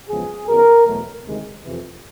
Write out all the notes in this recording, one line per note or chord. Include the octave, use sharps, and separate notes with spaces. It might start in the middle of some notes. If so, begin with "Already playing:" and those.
E2 C#3 F3 G#3 B3 G#4
F#2 D#3 F#3 B3 A#4
E2 B2 F#3 A3
D2 C3 D#3 G#3
F2 C3 E3